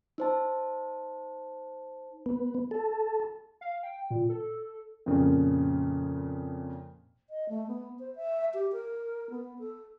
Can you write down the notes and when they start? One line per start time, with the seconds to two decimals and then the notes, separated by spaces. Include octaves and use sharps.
0.18 D#4 C5 A5
2.26 B3
2.71 A4
3.61 F5
3.83 G5
4.10 A#2
4.29 A4
5.06 F2 A#2 C#3
7.30 D#5
7.49 A3
7.67 B3
7.99 C5
8.16 E5
8.54 G4
8.72 A#4
9.30 B3
9.59 A4